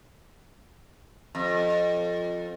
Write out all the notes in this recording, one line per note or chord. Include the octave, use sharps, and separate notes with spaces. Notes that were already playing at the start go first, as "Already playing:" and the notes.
F2